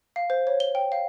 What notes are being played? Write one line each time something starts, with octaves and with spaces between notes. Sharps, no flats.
F5
C5
C#5
G7
G5
F5